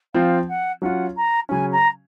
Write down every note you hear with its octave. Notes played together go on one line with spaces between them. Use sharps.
F3 C4 F4 F5
F#5
F#3 C#4 F4 F#5
A#5
C#3 F#3 C#4 G#5
A#5